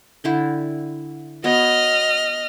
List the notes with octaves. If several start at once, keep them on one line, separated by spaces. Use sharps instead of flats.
D3 E4 G5
B3 F#4 C#5 D#5 F6